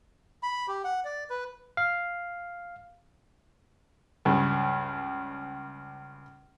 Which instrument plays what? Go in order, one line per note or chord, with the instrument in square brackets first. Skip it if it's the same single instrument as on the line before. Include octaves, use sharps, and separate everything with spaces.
[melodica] B5
G4
F#5
D5
B4
[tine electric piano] F5
[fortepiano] C#2 G2